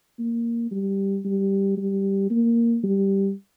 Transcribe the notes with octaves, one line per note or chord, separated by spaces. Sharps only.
A#3
G3
G3
G3
A#3
G3